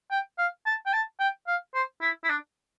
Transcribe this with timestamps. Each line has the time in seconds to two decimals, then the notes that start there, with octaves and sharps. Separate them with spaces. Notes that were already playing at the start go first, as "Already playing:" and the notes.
0.11 G5
0.38 F5
0.66 A5
0.86 G5
0.93 A5
1.20 G5
1.47 F5
1.74 C5
2.01 E4
2.24 E4
2.29 D4